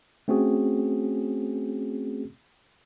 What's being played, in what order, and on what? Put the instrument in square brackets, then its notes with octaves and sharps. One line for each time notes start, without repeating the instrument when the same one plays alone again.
[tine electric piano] A3 C4 C#4 F#4 G#4